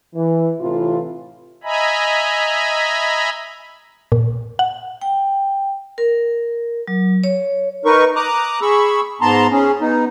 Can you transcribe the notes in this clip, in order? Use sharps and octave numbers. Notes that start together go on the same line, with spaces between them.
E3
A2 C3 E3 F4
D#5 E5 G#5 A#5 B5
A#2
F#5
G5
A#4
F#3
C#5
D#4 A#4 B4 C#6
A#5 D6 D#6 F#6
G#4 B5 C#6 E6
G#2 B3 A5 A#5 C6
C#4 G#4
B3 D#4